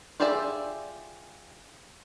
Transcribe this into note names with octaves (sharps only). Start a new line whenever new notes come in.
F4 G4 G#4 D5 E5